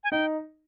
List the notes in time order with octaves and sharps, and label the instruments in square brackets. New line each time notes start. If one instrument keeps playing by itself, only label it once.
[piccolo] G#5
[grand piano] D#4 [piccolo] G5